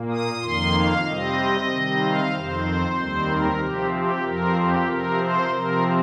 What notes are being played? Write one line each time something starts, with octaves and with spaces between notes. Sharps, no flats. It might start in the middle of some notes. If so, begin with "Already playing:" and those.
Already playing: A#2 A#3
D#6
F2 D#3 A#3 C6
F5
C3 G3 C4 D#5
C3 D#3 G3 C4
F5
F2 D#3 C4 C5
D#2 D#3 G3 C4
A#4
C3 F3 C4 G4
G4
F2 F3 C4 A#4
G4
C3 F3 C4 A#4
C5
C3 F3 C4 A#4